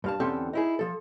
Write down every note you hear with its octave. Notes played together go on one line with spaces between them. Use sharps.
G2 F5 A5
E2 D3 C4 C#4 G4 A4
D#4 E4 G#4
F3 A4